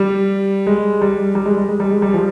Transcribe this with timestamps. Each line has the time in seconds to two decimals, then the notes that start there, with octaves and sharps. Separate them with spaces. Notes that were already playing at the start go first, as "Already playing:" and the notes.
Already playing: G3
0.67 G#3
1.02 G3
1.35 G3
1.46 G#3
1.58 G3
1.69 G#3
1.80 G3
1.91 G#3
2.02 G3
2.14 F3